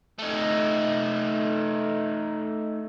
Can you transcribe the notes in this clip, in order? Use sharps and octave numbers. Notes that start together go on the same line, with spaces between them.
A3 D#4